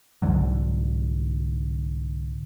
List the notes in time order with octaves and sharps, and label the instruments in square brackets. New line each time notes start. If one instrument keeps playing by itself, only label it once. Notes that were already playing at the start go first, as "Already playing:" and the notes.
[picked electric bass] C2 G#2 D3 F#3